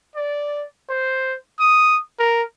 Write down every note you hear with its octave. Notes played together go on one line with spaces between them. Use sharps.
D5
C5
D#6
A#4